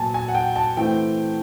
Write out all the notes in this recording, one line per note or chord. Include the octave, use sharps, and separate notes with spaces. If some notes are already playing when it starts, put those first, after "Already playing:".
Already playing: A#2 F#3 G#5 A5
G#5
F#5
G5
A5
E3 A3 C4 G5